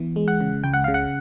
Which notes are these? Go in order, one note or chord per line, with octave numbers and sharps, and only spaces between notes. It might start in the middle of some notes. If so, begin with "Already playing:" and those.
Already playing: E3 B3
G#3
F#5
C#3
C#2 G5
F#5
C#3 F5
F#5